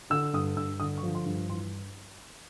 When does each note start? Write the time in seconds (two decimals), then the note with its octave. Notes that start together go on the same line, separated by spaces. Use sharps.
0.10 D3 E6
0.33 G2 D#6
0.56 G2 E6
0.80 D3 D#6
0.98 C#6
1.03 F3
1.15 C6
1.26 G2
1.50 E3 C6